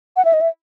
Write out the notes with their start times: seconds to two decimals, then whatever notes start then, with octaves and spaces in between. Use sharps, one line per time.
0.17 F#5
0.25 E5
0.33 D#5
0.41 E5